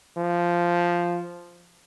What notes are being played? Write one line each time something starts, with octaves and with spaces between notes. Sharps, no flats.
F3